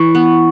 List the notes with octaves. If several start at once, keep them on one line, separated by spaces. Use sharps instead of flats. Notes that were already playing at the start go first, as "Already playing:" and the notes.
Already playing: E3 C#6
B3